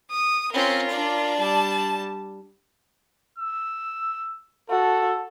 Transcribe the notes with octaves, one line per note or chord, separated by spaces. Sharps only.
D#6
C4 C#4 F4 A#4
D4 D5
G3 A5
E6
F#4 A4